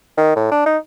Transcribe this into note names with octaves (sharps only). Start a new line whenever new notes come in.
D#3
A2
D4
D#4